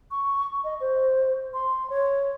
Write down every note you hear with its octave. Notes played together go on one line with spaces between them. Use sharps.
C#6
D#5
C5
C6
C#5